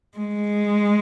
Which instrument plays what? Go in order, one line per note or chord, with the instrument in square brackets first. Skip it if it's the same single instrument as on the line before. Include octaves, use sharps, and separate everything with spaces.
[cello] G#3